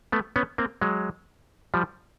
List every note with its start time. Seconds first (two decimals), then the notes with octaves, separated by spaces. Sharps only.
0.12 A3 B3
0.36 B3 C#4
0.58 A#3 C4
0.81 F#3 G#3
1.74 F3 G3